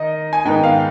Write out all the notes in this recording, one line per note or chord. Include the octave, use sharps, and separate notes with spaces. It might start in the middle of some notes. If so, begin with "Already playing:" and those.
Already playing: D#3 D#4 D#5
G#5
G#2 D#3 B3 D#4 G5
F5